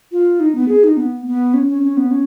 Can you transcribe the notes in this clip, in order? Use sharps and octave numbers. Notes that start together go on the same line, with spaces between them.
F4
D#4
B3
G#4
D#4
B3
B3
C#4
C#4
C#4
B3
C#4